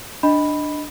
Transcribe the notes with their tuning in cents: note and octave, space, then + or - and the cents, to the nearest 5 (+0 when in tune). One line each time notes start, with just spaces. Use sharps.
D4 +10 D#5 +5 B5 +0